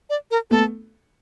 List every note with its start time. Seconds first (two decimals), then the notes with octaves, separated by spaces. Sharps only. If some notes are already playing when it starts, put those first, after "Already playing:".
0.10 D5
0.31 A#4
0.51 A3 B3 A4